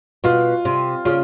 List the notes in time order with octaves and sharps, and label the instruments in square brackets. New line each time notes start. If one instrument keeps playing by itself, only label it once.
[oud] B2 [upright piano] F4
[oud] C3
[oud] C#3 [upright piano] F4